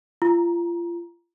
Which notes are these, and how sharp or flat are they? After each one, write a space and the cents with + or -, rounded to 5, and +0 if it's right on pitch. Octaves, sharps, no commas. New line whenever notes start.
F4 -30 A#5 +20